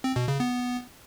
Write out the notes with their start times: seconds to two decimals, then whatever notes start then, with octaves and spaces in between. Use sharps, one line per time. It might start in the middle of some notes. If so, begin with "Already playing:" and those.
0.04 C4
0.16 B2
0.28 C#3
0.40 B3